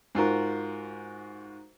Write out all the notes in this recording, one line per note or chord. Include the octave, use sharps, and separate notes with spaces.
G#2 F4 F#4 A#4